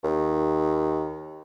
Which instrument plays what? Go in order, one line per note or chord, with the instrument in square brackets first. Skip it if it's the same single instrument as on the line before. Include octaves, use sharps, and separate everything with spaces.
[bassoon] D#2